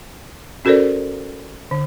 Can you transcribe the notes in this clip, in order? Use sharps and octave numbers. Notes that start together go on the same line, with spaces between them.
C#4 F#4 A4 A#4 C5 D5
D3